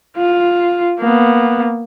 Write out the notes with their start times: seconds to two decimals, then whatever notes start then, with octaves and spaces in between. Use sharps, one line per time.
0.17 F4
0.99 A#3 B3